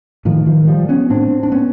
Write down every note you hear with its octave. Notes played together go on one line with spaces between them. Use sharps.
A2 D#3 F3
D#3 F3
G#3
F3 G3
B3 C#4
A2 C4 D4
D4
B3 C#4